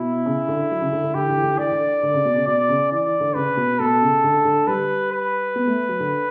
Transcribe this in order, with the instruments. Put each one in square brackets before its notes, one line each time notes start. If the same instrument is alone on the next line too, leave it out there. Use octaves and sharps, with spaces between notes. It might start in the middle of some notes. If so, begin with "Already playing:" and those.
Already playing: [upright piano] B2 [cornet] E4
[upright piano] C#3
D3
F#3
C#3
D3
D3
[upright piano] D3 [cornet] G4
[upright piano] E3
D3
E3
D3
E3
[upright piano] D3 [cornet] D5
[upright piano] E3
D3
D3
C#3
B2
C#3
[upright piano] B2 [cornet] D5
[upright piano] C#3
[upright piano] E3 [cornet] D5
[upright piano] E3
D3
[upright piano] C#3 [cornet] B4
[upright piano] B2
[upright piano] B2 [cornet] A4
[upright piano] C#3
D3
D3
[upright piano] G3 [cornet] B4
[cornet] B4
[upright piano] B3
A3
F#3
D3